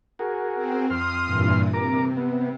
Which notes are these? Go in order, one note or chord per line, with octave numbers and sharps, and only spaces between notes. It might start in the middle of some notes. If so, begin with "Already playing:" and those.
F#4 G#4 A#4
C4
F2 C6 D#6 F6
G2 A#2 E3
C3 A#4 A#5 D6
B3